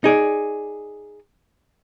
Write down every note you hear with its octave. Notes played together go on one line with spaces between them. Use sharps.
D#4 G#4 D5